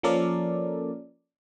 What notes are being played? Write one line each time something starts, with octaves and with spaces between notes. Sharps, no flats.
F3 A#3 C#4 A4 A#4 D5